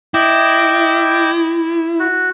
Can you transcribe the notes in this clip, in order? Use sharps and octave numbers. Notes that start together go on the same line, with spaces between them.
E4 D#5 G5 D6
F#4